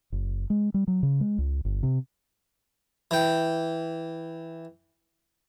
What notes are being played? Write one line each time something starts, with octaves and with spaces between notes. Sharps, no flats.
F#1
G#3
G3
F#3
C#3
G#3
C#2
G1
C3
E3 G5